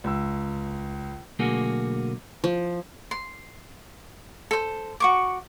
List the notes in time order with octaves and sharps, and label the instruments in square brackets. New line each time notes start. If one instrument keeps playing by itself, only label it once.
[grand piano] C#2 E6
[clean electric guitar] B1 D3 A3 A#3 F#4 G#4
[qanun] F3
[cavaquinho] C6
A4 C5
F#4 C#6 D6